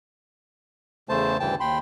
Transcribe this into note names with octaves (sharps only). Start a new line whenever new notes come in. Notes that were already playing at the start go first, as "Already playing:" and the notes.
E2 C#3 A3 C5 A5
D2 G2 C#3 E3 G5 A5
D#2 G5 B5 C6